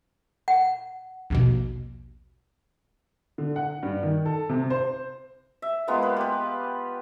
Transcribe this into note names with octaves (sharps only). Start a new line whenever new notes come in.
F#5
A#1 D#2 B2
D3
F#5
G2
D#3
A4
C3
C5
E5
G#3 A#3 B3 F4
B4
G4 B4